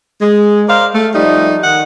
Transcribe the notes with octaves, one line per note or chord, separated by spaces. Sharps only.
G#3
A#4 C5 D5 F5
A3
F3 G3 A3 D#4
D#3 F#5